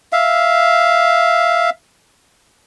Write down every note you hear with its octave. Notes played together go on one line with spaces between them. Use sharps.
E5 F5